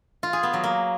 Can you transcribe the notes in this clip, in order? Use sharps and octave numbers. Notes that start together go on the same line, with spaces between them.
F4
G#4
B3
F#3
A#3